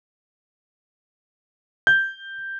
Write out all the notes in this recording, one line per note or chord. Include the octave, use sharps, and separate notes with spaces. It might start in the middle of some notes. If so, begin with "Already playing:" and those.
G6